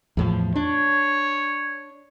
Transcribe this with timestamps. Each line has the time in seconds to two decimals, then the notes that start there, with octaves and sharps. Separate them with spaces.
0.17 E2 A2 F3
0.56 D4 C#5